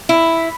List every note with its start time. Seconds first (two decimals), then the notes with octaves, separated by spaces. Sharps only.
0.09 E4